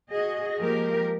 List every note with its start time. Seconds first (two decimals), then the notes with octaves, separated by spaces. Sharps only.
0.11 F#4 G#4 D#5
0.58 F3 G#3 A#3 G4 A#4